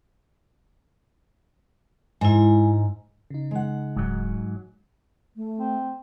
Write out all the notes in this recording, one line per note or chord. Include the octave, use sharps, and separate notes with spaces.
G#2 G#3 E4
C#3 D#4
G#3 F#5
D#1 G#2 F#3
A3
C4